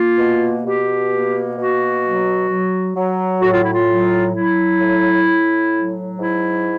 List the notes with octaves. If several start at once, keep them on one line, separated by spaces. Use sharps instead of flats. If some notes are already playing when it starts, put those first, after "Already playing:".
Already playing: A#3 F4
B2
B2 G4
A#3
B2 F#4
F#3
F#3
F#3
A2 F#4
F4
E4
F4
F#3
F#3 E4
A2
A2
F#3
G#2 E4